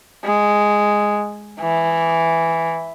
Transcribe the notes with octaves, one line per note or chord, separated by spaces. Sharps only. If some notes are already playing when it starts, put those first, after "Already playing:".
G#3
E3